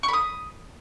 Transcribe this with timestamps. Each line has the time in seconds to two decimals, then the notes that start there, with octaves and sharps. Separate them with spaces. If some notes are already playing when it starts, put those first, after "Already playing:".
0.03 C#6
0.08 B5
0.13 D#6